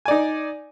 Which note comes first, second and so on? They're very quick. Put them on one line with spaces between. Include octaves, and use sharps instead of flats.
G#5 D5 D#4